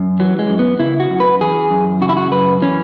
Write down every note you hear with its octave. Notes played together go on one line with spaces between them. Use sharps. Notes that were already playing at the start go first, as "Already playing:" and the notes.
Already playing: F#2
E3 F#3
G#3
F#2
B3
C#3 E4
F#4
F#2
B4
E3 G#4
F#2
C#3 F#4
E4
F#4
F#2 B4
E3 C#4